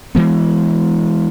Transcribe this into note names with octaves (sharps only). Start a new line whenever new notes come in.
E3 G#3 B3